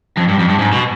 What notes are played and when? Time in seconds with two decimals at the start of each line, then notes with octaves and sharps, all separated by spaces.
0.17 F2
0.28 G2
0.39 F2
0.48 G2
0.59 G#2
0.73 B2